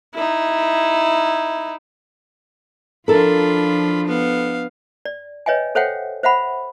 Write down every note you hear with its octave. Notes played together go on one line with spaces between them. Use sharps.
D#4 E4
F3 D4 E4 F4 A4 A#4 B5
B3 F5
D5
B4 C#5 D#5 E5 G5 G#5
A4 C5 C#5 E5 F#5 G5
C5 E5 F#5 B5